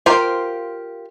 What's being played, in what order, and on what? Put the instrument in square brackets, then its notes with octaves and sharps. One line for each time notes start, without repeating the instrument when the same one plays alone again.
[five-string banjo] F4 G4 A#4 C5 F5